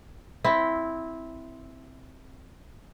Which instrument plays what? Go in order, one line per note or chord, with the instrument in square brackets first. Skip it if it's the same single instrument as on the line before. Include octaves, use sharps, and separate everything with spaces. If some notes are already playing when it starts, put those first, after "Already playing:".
[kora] C4 E4